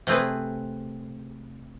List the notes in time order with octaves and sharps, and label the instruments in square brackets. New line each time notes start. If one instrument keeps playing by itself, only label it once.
[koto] C3 A3 C4 G#4 B4